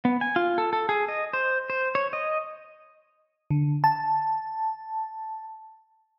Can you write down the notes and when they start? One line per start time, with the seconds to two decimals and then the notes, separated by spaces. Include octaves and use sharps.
0.05 B3
0.21 G#5
0.36 F4
0.58 A4
0.73 A4
0.89 G#4
1.08 D#5
1.33 C5
1.70 C5
1.95 C#5
2.13 D#5
3.50 D3
3.84 A5